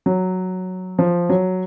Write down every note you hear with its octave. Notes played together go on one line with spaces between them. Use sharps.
F#3
F3
F#3